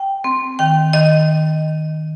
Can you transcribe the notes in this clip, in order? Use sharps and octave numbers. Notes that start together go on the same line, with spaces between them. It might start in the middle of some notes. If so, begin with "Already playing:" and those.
Already playing: G5
C4
D#3 G5
D#3 D#5